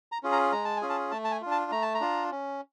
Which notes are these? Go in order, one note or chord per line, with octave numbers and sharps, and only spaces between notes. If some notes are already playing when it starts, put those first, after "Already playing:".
A#5
C#4 F4 G#4
A#5
G#3 A#5
A5
G#5
C#4 F4 G#4
A5
A3 A5
A5
G#5
D4 F4
A5
A3 A#5
A5
A#5
D4 F4
C#4